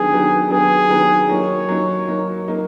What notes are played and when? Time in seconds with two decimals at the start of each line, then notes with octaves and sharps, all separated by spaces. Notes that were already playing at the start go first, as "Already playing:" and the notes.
Already playing: D#3 F#3 B3 D4 G4 G#4
0.11 D#3 F#3 B3 D4 G4
0.50 D#3 F#3 B3 D4 G4 G#4
0.90 D#3 F#3 B3 D4 G4
1.29 F#3 A#3 D#4 C#5
1.69 F#3 A#3 D#4
2.08 F#3 A#3 D#4
2.48 F#3 A#3 D#4